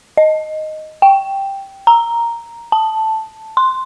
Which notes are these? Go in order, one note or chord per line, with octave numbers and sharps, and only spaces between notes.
D#5
G5
A#5
A5
C6